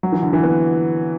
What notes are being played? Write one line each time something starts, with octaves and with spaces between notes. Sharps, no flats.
F#3
E3
D3
E3
B3